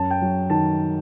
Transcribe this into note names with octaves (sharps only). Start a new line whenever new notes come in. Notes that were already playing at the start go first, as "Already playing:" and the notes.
Already playing: F#2 A5
G5
F#3
D#3 A5